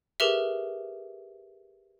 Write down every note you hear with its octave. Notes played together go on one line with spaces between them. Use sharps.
G4 G#4 A#4 B4 E5